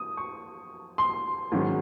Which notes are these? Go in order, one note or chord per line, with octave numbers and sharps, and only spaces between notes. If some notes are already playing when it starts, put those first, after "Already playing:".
Already playing: D#6
C#6
C6
G#2 D#3 F#3 C#4